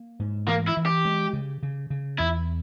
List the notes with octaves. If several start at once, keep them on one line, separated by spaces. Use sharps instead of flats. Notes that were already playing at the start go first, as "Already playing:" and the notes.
Already playing: A#3
G#2
E3 A#3
E4
E3
G4
G#3
C#3
C#3
C#3
E2 E4